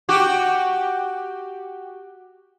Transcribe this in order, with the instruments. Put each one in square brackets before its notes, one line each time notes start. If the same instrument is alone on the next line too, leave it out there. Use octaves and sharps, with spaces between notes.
[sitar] F#4 G4